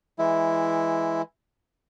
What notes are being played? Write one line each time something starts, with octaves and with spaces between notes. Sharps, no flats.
E3 G#3 E4